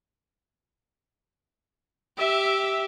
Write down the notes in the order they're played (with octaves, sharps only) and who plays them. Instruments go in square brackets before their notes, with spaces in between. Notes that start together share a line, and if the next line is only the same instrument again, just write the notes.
[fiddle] G4 [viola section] E5